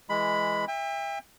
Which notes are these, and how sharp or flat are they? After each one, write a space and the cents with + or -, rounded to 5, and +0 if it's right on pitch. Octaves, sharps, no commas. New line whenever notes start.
E3 +0 G#3 +0 B5 +10
E5 +0 G5 +40